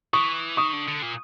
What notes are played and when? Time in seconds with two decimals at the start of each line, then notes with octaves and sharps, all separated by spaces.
0.13 E3 C#6 D#6
0.57 D#3 C#6 D#6
0.73 D3
0.88 D3
1.02 A#2